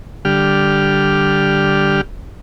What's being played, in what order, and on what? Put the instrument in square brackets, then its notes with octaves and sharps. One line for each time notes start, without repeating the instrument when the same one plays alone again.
[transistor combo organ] D3 G3 G4 F6